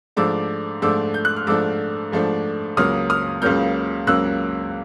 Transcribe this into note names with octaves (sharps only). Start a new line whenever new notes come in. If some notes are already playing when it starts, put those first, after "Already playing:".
G#2 F3 A3 D4 D6 E6
G#2 F3 A3 D4 D6 E6
G6
F#6
F6
G#2 F3 A3 D4 D6 E6
G#2 F3 A3 D4
C#2 C#3 F#3 A#3 D#6 F6
D#6 F6
C#2 C#3 F#3 A#3 F6 G6
C#2 C#3 F#3 A#3 E6 F#6